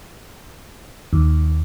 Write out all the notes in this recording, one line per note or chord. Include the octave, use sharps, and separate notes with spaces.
D#2